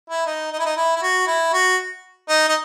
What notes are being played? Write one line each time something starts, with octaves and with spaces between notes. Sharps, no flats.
E4
D#4
D#4
E4
D#4
E4
E4
F#4
E4
F#4
D#4
D#4